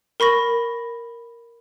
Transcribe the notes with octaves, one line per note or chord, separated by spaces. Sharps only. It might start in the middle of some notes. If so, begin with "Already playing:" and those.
A#4 B5 C#6 A#6